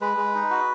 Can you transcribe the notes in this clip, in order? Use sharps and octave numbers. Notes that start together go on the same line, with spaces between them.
G#3 B4
G#3
D#4
F#4